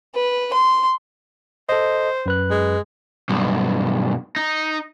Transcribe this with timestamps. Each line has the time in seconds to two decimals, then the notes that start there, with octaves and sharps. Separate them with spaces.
0.15 B4
0.53 C6
1.69 A4 C5 D#5
2.26 F#2 B4 F#6
2.50 G#3
3.29 B1 G2
4.36 D#4